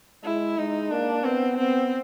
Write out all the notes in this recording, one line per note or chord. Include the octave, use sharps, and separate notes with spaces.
G#3 E4
G#3 D#4
A#3 D4
B3 C4
B3 C4